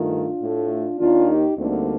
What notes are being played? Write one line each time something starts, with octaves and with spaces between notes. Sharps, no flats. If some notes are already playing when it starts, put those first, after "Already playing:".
Already playing: G2 D#3 A3 D4 F4
A2 A3
D#2 D#3 A#3 D4 F4
D#4 G4
D2 D3 G3 A#3 C4 D#4